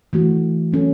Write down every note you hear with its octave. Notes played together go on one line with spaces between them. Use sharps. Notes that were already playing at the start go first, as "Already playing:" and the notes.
E3 A3 F#4
F#3 C#4 A4